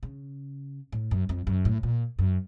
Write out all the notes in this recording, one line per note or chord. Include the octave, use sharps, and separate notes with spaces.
C#3
A2
F#2
F2
F#2
A2
A#2
F#2